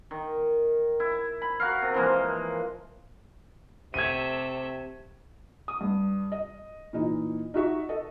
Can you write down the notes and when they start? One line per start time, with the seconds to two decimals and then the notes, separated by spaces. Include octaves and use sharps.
0.11 D#3
1.00 E4
1.42 B5
1.60 F#4 A#4 F5
1.82 C3
1.94 E3 F3 G#3 A#3
3.94 C3 A3 E5 G#6 D#7
5.68 D#6
5.81 G2
6.32 D#5
6.93 A#2 E3 D#4
7.54 D#4 F#4 E5 C#6
7.89 A4 D#5